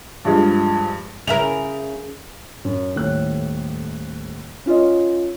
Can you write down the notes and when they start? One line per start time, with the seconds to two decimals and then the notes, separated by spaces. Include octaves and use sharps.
0.25 G2 F3 G#3
1.27 C#3 E4 A#4 F7
2.65 F#2
2.95 D#1 A2 C#5 F#6
4.66 C#4 F4 C#5 D#5